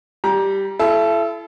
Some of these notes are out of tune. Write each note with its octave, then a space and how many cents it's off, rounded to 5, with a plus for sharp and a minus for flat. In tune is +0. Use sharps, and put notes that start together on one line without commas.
G3 -5 G4 +0 A#5 +25
E4 +35 A4 -25